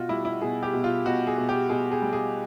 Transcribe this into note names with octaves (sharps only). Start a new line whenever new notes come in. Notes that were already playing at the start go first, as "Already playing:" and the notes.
Already playing: B2 F4 F#4
G3 E4
E4
B2 G#4
G4
B2
F4
B2 F#4
G#4
B2
G4
B2 G#4
G#4
G3
G#4